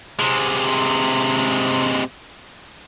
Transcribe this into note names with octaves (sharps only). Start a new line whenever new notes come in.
C3 G#3